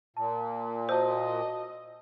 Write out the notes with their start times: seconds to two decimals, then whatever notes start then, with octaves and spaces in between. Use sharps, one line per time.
0.17 A#2 A5
0.89 F#4 C5 D#5 A5 E6